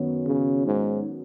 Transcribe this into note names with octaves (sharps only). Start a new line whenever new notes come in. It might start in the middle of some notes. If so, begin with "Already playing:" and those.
Already playing: F#2 D#3 B3 F#4 C#5
C#3
G#2